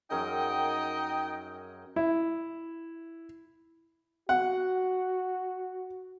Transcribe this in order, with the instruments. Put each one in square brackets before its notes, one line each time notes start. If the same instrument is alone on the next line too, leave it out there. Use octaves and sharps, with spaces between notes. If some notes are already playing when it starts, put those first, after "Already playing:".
[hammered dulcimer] F#2 G#4 A#4 [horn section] D#4 D#5 G5
[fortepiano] E4
[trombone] F#4 [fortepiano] F#5